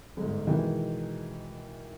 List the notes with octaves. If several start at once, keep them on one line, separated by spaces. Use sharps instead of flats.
G1 G#2
B2 D#3 E3 G#3